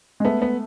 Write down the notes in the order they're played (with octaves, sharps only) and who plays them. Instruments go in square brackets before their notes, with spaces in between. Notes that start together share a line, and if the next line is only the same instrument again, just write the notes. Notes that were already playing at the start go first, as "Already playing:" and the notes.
[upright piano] G#3
[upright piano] A3 [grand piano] B3
[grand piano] B3